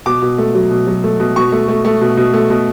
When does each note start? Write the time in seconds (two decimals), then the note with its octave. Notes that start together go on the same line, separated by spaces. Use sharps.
0.06 B2 D6
0.22 B2
0.38 A3
0.55 F#3
0.71 B2
0.87 F#3
1.04 A3
1.20 B2
1.36 B2 C#6
1.52 A3
1.68 A3
1.85 A3
2.01 B2
2.17 B2
2.33 A3
2.50 B2